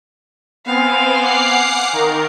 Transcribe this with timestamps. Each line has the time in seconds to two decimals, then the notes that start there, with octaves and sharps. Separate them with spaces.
0.66 B3 C4 F5 G#5
1.22 F#5 D6 C7
1.93 D#3 A#4